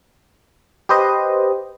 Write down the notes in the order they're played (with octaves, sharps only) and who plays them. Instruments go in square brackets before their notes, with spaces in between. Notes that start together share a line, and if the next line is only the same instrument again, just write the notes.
[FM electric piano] G4 B4 C5 D#5